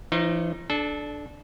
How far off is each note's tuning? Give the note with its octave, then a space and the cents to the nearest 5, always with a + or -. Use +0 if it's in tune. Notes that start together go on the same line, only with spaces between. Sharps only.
E3 +45 D#4 +0 C5 +45
D4 +0 A4 -25